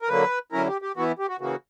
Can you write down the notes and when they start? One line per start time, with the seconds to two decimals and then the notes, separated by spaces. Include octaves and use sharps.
0.02 A#4
0.08 D3 F#3 A#3 B4
0.52 D3 F#3 C#4 E4 A#4
0.67 G4
0.82 G4
0.97 E3 B3 E4 F#4
1.19 G4
1.29 F#4
1.40 C#3 E3 A#3 F#4